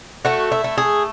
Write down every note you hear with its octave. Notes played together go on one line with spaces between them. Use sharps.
A3 F#4
E4
A3
G#4